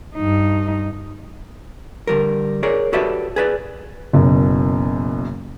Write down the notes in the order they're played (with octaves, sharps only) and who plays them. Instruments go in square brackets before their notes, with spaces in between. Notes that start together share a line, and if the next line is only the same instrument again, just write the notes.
[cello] G2 D#4
[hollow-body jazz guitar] D3 G3 A#4
G#4 A#4 C#5 D5
F#4 G4 A4 B4 D5 E5
G#4 B4 D5
[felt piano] F#1 F#2 B2